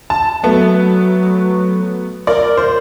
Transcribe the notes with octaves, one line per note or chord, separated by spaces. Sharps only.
A5
F#3 A3 B3
A#4 D5
C5